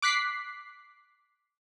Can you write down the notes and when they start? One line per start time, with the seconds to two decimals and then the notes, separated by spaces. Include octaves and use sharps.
0.02 D6 F#6 B6 C7